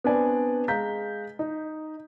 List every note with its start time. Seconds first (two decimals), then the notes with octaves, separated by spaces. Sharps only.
0.04 B3 C4 D4 B4 D5 G#5
0.68 G#3 F5 A#5 G6 B6
1.39 D#4